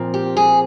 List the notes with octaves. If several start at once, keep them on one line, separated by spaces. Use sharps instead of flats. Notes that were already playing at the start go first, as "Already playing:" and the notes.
Already playing: A#2 F3 C4
G4
G#4